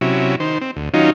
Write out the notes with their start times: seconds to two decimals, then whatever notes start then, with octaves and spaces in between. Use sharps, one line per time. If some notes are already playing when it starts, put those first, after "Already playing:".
0.01 C3 F#3 C#4 E4
0.40 D#3 C5
0.61 C4
0.76 D2
0.94 D#3 F#3 C#4 D#4 F4